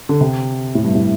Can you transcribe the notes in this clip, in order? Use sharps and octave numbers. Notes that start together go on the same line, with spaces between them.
D3
C3
A2
G2
A2